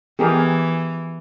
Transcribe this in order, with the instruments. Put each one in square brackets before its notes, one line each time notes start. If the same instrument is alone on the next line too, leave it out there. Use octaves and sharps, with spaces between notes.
[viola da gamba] E3 [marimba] B3 [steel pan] G4 G#4 A#4